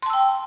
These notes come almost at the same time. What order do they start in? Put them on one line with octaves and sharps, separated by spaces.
C6 A5 E6 G5